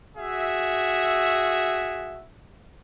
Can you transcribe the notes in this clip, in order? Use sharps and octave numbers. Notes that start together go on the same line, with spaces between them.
F#4 G#4 E5